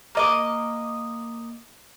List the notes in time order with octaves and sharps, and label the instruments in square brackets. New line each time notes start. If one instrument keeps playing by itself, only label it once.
[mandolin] A#3 D#5 D6